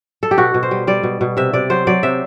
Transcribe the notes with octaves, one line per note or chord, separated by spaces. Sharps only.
A4
G4
B2 F#4
B2
C5
G3
G3 D5
B2
B2
C3 E5
C3 D5
F#3 C5
F#3 D5
C3 E5